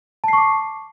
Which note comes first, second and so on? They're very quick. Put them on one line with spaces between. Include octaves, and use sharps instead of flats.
A5 C7 C#6 D6